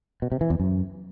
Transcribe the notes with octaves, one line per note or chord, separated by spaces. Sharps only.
B2
C3
E3
E2
F#2